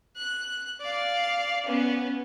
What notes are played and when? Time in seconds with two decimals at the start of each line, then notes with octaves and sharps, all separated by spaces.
0.17 F#6
0.81 D5 F5
1.66 B3 C#4